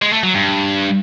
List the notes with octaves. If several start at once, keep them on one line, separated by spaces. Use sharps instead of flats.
G#3
A3
F#3
G2